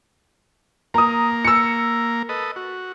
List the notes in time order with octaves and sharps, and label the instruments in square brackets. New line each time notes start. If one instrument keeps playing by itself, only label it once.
[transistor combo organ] A#3 A#4 [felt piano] A#5 D#6
[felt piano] E6 C#7
[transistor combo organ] A4 B4 D#5
F#4